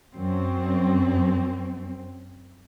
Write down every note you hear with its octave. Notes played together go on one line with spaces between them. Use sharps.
F#2 C4